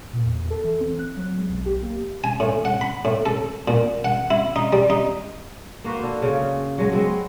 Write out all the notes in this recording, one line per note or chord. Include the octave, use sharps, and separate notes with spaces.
A#2
E2
E2
A4
E3
C4
F#6
F#3
G#3
B1
G4
A#3
G#5
A2
F#5
B5
A2
A4
A#2
F#5
E4
D#4
G3
D#4
A#3 F#4 B4 C5
D3
C#3 C#4
F#3 G#3
G#3 B3 C4